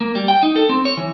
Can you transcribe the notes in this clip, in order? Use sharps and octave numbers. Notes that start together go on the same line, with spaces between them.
A#3
G3
G5
D#4
A4
C4
C#5
E3